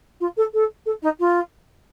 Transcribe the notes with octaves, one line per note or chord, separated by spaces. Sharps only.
F4
A4
A4
A4
D#4
F4